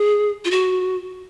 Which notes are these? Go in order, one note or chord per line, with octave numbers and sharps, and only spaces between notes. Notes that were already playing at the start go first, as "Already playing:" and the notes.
Already playing: G#4
F4
F#4